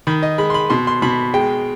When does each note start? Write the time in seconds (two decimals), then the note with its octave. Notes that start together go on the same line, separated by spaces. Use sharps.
0.07 D#3 B5
0.23 D#5
0.38 G#3 B5
0.50 C6
0.54 B5
0.70 B2 C6
0.87 C6
1.02 B2 B5
1.34 G#3 G5